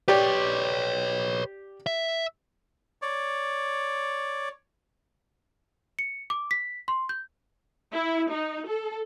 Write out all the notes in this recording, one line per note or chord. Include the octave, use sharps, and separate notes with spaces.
G4 B4 C#5 D5
E5
C#5 D5
C#7
D6
B6
C6
G6
E4
D#4
A4